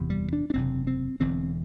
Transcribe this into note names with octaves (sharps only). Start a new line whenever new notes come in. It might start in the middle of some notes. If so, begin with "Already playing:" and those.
Already playing: F#1 E2 C3
G3
D4
D4
F#1 E2 C3 C4
C4
E1 E2 D3 C4